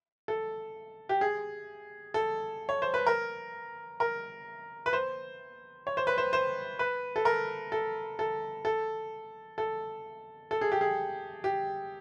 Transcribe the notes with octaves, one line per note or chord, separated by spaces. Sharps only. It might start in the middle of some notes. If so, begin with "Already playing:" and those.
A4
G4
G#4
A4
C#5
C5
B4
A#4
A#4
B4
C5
C#5
C5
B4
C5
C5
B4
A4
A#4
A4
A4
A4
A4
A4
G#4
G4
G#4
G4